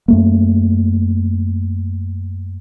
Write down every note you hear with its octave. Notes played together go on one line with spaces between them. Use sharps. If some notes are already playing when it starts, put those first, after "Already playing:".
F#2 A3 A#3